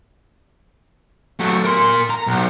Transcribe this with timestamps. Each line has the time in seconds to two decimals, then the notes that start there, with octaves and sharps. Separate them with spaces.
1.40 F#3 A3
1.65 A#4 C6
2.10 A#5
2.27 B1